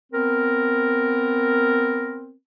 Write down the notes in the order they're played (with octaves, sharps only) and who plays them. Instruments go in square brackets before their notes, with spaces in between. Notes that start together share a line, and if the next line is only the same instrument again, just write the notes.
[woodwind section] B3 C4 A#4